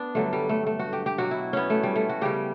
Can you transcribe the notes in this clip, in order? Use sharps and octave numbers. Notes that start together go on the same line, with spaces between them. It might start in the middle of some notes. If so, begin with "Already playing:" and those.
Already playing: B3 D4
G2 D3 F#3 A3
G3
A3
A3
F#4
G4
G4
B2 F#3 F#4
E4
B3 C#4
A3
G3
A3
F#4
C#3 G3 G4